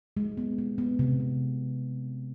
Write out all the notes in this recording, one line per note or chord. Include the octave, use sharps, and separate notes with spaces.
G#3
B3
B3
B3
C3
C3